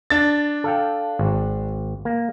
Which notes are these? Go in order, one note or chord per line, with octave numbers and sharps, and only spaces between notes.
D4 A6
A4 F5 G5
G#1
A#3